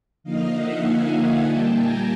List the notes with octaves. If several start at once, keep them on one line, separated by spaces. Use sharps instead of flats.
D3 F3 A#3 D#4 D#5 F5
E5 F#5
F#5 G#5
A#2 G3 A#3 G5 A5
G#5 A#5